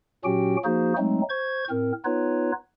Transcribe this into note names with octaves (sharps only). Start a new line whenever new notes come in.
A#2 F#3 C#4 F#4 G4 G5
F3 A#3 D#4 F#4 G#4 C5
F#3 G#3 A3 C4 D#4
C5 C#6 G#6
A2 C4 A#4
B3 D#4 F4 B4 C#5